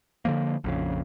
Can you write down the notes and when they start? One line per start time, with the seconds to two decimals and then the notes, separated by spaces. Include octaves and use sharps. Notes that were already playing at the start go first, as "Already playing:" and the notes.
0.25 D3 D#3 F3 A#3
0.64 A#1 F2 C#3